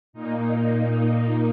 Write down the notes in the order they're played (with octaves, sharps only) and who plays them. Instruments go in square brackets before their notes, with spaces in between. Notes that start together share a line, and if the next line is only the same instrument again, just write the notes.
[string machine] A#2 A#3 D#4